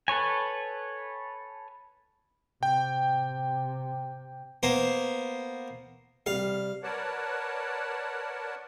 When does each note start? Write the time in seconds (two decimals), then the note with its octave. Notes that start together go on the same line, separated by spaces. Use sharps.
0.08 A4 B4 C#5 G#5
2.63 C3 G5
4.63 A#3 B3 C5
6.26 C3 G3 F5
6.83 A#4 B4 C#5 D5 F#5 A5